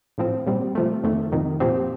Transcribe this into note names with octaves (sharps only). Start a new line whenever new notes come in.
A2 F3 C4
A#2 G3 C4
C3 F3 A3
F2 D#3 A3
F2 C3 D#3
A#2 F3 C4 G4